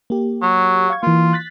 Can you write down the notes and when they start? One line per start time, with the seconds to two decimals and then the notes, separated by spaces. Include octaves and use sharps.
0.10 A#3 G4
0.42 F#3
0.90 F5 C#6 G#6
1.03 E3 A#3 F4
1.33 F#6 A6 B6